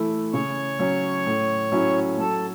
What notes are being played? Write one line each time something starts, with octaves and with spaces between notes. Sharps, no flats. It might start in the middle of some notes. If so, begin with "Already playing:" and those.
Already playing: E3 A3 E4
C#3 C#5
F#3 C#4
A2
F#3 C#4 E4
F#3 A4